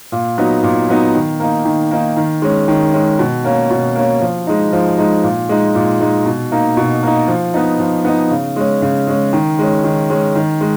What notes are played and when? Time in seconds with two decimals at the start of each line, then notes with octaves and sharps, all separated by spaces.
0.12 A#2
0.38 F#3 B3 D#4
0.63 A#2
0.89 F#3 B3 D#4
1.14 D#3
1.40 A#3 D#4
1.65 D#3
1.91 A#3 D#4
2.17 D#3
2.42 G#3 C#4
2.68 D#3
2.93 G#3 C#4
3.19 B2
3.45 A#3 C#4
3.70 B2
3.95 A#3 C#4
4.21 F3
4.47 G#3 D#4
4.73 F3
4.98 G#3 D#4
5.23 A#2
5.49 G#3 D#4
5.75 A#2
6.01 G#3 D#4
6.26 B2
6.52 A#3 D#4
6.77 B2
7.03 A#3 D#4
7.28 F3
7.54 B3 D#4
7.79 F3
8.05 B3 D#4
8.31 C#3
8.56 G#3 C#4
8.82 C#3
9.07 G#3 C#4
9.33 D#3
9.59 G#3 C#4
9.84 D#3
10.10 G#3 C#4
10.35 D#3
10.61 G#3